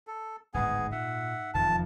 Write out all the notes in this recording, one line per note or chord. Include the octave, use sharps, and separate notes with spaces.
A4
D1 G#1 G#2 G#3 B3 G#4 G#5
A#2 E5 F#5
E1 F2 D#3 A5